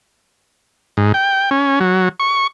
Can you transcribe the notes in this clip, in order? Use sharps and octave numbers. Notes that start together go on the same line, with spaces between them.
G#2
G5
C#4
F#3
C#6